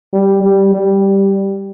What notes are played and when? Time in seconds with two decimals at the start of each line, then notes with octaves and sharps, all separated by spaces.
0.13 G3
0.42 G3
0.73 G3